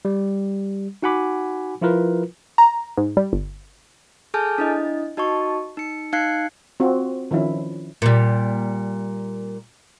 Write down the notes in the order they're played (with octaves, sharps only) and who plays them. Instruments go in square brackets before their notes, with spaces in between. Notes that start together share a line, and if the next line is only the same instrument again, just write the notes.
[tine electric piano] G3
D#4 F#4 F#5 G#5 B5 D6
F3 E4 F4 A#4 B4
[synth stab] A#5
G#2
G3
G1
[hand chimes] G#4 A4 G#5 A5 F6 G6
D4 E4 D#5
D#4 F#4 D#5 A5 C#6
D#4 C#7
D#4 F5 F#6 G#6 C7 C#7
[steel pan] C4 F4 F#4
D#3 F3 C#4 E4
[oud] A#2 G3